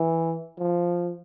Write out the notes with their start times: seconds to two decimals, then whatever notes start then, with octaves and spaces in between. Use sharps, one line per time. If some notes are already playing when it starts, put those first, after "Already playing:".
Already playing: E3
0.58 F3